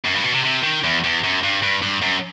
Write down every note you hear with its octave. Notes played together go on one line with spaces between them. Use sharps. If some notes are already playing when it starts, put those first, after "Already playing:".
F#2
G2
B2
C3
C3
D#3
E2
E2
F#2
G2
G2
G2
F#2